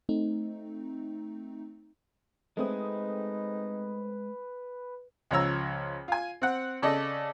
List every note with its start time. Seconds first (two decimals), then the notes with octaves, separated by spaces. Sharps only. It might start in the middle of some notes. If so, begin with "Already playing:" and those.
0.09 A3 C4 D#4
2.57 G#3 A3 C4 D#4 B4 D#6
5.31 C#2 F3 C#5 A#5 E6
6.08 F4 G#5
6.42 C4 F#5
6.82 C#3 A4 D5 D#5